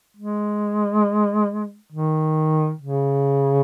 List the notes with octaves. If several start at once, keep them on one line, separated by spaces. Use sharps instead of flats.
G#3
D#3
C#3